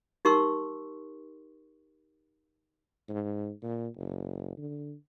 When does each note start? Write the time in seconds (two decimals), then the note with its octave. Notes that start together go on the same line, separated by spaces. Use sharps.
0.25 D#4 G4 A#4 C6 C#6 E6
3.09 G#2
3.63 A#2
3.97 F#1
4.58 D3